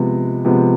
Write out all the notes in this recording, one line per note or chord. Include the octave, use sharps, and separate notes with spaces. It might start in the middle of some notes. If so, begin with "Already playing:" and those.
Already playing: C3 F3 G#3 B3
C3 F3 G#3 B3